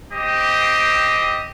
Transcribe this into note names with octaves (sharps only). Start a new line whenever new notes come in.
C4 G4 D#5 G5